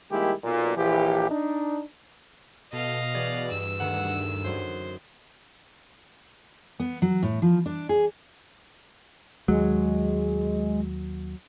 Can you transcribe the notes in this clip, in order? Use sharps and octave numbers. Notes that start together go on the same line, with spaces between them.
D#3 G3 G#3 A#3 E4 G4
B1 A#2
A#1 E3 G4
D4 D#4
B2 A4 D#5 F5
E3 F#4 G#4 D5
G2 E6
D2 G2 D#3 F#5
F#2 F#4 C5 D#5
B3
F#3
A2
F3
D4
G#4
D#2 F#3 G#3